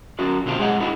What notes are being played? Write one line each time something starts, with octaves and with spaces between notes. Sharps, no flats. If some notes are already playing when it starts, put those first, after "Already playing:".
F#3 C#4 F#4 D5
B2 D3 C4 F4 G4 A5
G#3 G#4 C#5 D#5 F#5
D4 E4 F#4 G4 A4